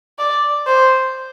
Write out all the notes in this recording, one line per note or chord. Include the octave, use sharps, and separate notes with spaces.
D5
C5